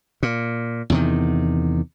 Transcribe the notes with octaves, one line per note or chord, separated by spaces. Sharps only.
A#2
E2 C3 D#3